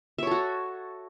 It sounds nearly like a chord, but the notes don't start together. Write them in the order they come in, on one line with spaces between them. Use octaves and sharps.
E5 C#5 A4 F#4